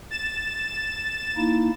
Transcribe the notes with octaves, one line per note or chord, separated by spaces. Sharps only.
A6 E7
A#3 D#4 E4